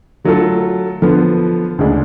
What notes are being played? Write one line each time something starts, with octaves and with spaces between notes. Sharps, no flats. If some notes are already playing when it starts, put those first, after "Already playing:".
D3 F#3 A3 F4 A4
D3 F3 B3
D2 C#3 G#3 D4